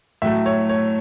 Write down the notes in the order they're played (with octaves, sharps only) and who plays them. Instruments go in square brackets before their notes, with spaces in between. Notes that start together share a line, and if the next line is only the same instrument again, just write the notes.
[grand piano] A2 F#3 A3 E5
C#5
C#5